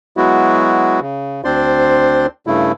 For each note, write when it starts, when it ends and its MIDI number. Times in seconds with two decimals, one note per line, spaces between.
0.17 1.00 54
0.17 1.00 56
0.17 1.00 59
0.17 1.00 64
0.17 1.00 66
1.01 1.41 49
1.44 2.27 38
1.44 2.27 60
1.44 2.27 62
1.44 2.27 72
1.44 2.27 74
1.44 2.27 84
2.47 2.72 43
2.47 2.72 49
2.47 2.72 57
2.47 2.72 64